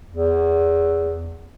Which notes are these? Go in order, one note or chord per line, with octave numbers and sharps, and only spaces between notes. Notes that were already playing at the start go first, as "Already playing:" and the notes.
E2